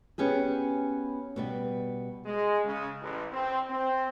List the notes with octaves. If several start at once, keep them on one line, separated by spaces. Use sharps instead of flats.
B3 C#4 G4 G#4
B2 G3 B3
G#3
C#3
A1
C4
C4